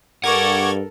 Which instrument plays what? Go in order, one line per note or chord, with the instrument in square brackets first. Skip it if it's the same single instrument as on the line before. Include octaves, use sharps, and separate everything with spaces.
[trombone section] G2 [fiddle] A4 A#4 [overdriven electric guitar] F#5 [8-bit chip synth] C#6 D6 G#6